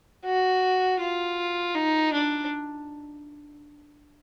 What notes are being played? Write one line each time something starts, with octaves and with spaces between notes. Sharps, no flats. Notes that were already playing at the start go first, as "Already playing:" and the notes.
F#4
F4
D#4
D4